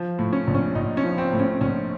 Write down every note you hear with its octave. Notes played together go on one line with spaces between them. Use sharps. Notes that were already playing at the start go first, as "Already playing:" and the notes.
Already playing: F3
A2
C#4
A#1
C#4
A#1 D#4
C#4
F3
C4
A2
C#4
A#1 C#4